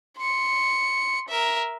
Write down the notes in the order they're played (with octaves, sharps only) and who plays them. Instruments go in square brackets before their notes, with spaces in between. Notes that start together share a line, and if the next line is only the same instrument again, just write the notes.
[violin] C6 C#7
A#4 E5